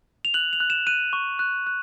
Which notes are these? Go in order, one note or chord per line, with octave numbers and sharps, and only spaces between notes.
F7
F#6 F#7
F7
F#6
E7
F#6 D#7
C#6
F#6
F#6